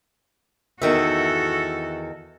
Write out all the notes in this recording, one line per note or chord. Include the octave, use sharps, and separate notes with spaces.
E2 D#3 F#4 A4 E5